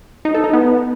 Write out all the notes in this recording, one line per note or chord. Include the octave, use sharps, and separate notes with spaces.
D#4
A4
D#4
B3